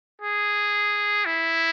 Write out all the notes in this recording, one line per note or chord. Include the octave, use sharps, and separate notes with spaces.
G#4
E4